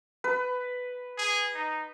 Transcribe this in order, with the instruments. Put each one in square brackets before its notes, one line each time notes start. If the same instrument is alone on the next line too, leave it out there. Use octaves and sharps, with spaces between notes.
[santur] B4
[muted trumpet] G#4
D#4